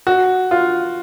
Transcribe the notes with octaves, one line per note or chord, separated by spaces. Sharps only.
F#4
F4